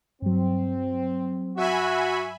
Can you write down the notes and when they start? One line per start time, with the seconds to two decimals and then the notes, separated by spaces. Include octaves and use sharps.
0.22 G2 F#3 C4
1.57 F#4 E5 G#5 B5